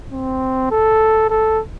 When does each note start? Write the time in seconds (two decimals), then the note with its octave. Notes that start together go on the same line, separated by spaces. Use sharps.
0.12 C4
0.71 A4
1.30 A4